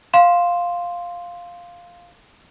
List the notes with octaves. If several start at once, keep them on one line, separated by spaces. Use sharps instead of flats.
F5 C6 E7